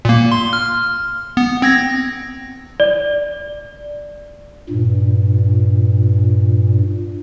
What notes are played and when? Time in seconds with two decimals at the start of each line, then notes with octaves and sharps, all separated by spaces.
0.05 A#2 A#3
0.32 C6
0.53 F6
1.37 B3
1.62 C4 G#6 A#6
2.80 D5
4.69 G2 A#2